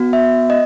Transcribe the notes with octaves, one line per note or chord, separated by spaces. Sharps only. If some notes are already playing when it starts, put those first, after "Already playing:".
Already playing: B3 F#4
E5
D#5